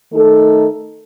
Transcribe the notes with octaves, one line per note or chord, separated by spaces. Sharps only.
D#3 A3 D#4 A4